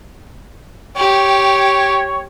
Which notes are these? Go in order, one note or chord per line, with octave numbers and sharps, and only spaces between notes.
G4 C#5 G5